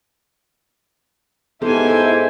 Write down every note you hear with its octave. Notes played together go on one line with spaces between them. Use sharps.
G#2 B3 E4 G4 A4 C5 G#5